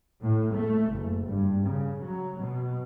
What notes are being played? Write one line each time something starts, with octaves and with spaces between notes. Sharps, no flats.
A2
A3
F#1
G2
C#3
F#3
B2